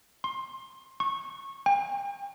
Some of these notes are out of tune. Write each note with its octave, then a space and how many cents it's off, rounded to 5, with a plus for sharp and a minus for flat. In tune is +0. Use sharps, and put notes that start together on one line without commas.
C6 +20
C#6 -20
G5 +40